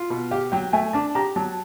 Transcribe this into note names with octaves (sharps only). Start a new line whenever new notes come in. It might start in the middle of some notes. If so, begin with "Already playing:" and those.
Already playing: F4
B2
G4 F5
F#3 G5
A3 G#5
D4 A5
G4 A#5
F#3 A5